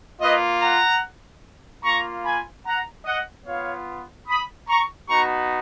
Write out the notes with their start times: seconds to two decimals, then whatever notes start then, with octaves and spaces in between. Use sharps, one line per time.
0.21 A#3 F4 B4 D#5
0.61 F#5 A#5
1.83 A#3 F4 A#5 C#6
2.25 G#5 B5
2.65 F#5 A#5
3.05 D#5 F#5
3.46 B3 F4 C#5 F5
4.27 B5 D#6
4.68 A#5 C#6
5.08 B3 D#4 F#4 A#5 C#6